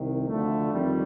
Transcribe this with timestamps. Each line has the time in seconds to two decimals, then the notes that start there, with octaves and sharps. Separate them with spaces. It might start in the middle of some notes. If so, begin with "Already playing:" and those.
Already playing: C2 C3 D#3
0.28 D2 D3 F3 A3
0.72 F2 D#3 G3